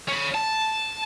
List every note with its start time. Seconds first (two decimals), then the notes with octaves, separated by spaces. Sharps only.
0.08 C#4 B5
0.35 A5